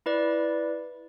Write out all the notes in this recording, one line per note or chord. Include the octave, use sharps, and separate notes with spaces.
E4 B4 D5